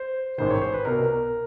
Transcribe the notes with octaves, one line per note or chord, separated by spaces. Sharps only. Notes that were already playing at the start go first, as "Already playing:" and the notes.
Already playing: C5
A1 G#2 D#3 C5
C#5
C5
B4
C2 B2 A#4